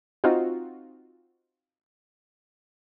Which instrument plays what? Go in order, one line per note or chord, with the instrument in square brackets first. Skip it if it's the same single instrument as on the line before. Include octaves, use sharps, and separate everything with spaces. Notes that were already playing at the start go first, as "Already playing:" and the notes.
[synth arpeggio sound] C4 D#4 F4 F#4